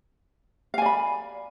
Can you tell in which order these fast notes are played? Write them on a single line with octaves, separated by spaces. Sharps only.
F5 G#5 D5 B5